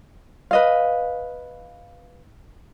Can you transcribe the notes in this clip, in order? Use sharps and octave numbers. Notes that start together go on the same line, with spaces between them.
B4 D#5 F5